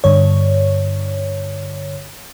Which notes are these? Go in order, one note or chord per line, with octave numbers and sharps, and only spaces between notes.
G2 D3 C#5